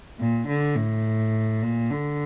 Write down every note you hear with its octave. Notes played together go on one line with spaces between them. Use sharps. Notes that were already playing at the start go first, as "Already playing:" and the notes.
A#2
D3
A2
A#2
D3